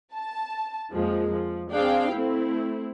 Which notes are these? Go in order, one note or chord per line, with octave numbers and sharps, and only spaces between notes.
A5
F2 F3 G#3 A#3
F3
C4 D4 G#4 F5 G5
A3 C4 E4